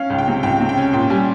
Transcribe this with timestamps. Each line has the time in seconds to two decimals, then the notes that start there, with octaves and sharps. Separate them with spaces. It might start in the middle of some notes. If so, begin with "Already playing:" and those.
Already playing: C#4 F5
0.10 C#2
0.18 G5
0.28 C3
0.43 C#2 G5
0.60 C3
0.69 G5
0.77 C#4
0.93 A#2 G5
1.10 G3 G#5